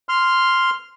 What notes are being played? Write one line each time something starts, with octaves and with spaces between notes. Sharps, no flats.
C6 F6